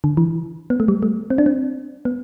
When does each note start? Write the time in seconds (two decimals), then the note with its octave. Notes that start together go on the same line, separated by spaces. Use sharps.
0.04 D3
0.17 E3
0.70 B3
0.80 A3
0.88 G3
1.03 A3
1.30 C4
1.38 D4
1.46 C4
2.05 B3